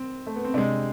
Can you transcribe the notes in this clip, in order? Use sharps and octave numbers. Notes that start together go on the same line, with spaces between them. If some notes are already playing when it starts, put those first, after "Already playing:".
Already playing: C4
A3
B3
C4
C3 G#3 D4